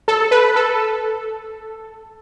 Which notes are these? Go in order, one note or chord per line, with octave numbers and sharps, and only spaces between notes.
A4
B4
A4